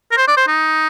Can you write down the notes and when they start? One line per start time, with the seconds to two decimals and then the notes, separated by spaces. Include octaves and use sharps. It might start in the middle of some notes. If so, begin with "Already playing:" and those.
0.11 A#4
0.17 C5
0.28 D5
0.37 C5
0.47 D#4